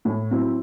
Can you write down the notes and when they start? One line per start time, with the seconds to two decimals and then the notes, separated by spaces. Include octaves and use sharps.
0.05 A2
0.30 F#3 C4 E4